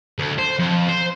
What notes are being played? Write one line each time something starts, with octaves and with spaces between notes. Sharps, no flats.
D2
C5
F2
C5